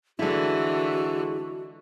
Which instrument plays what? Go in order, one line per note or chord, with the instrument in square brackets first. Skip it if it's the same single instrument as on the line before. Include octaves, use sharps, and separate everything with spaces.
[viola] D3 E3 [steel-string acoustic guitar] G#3 E4 [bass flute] F#4